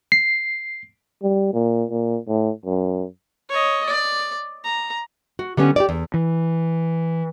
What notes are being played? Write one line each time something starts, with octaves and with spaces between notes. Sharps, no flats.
C7
G3
A#2
A#2
A2
F#2
C#5 D#5
D5
A#5
F#4
D3 G3 B3 C#4
G4 A#4 D5
E2
E3